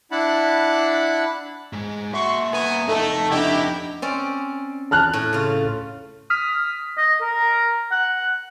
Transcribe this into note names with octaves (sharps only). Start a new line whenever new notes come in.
D4 E4 F#5 A5 B5
G#2 G#3
A#3 F#4 E5 C6 C#6
B3 G#5 A#5
F2 A3 D#4 A4 A5
D4 E4 G4 D#5 F#5
C4 C#4 D5
A5 F6 F#6
A2
C#3 F4
D#6 F6 B6
D#5
A#4
F#5